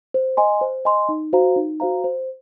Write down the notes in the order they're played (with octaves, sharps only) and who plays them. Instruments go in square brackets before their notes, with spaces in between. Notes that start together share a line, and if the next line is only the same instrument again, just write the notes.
[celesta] C5
D#5 G#5 C6
C5
D#5 G#5 C6
D#4
F#4 C5 F5 A#5
D#4
F#4 C5 F5 A#5
C5